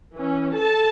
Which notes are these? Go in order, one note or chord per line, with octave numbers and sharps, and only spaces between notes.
E3 C#4
A4 A5